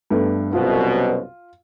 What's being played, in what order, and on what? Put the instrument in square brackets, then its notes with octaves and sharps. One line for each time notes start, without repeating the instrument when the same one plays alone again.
[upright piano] G2 A3 B3
[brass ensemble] C2 F#2 B2 [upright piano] F4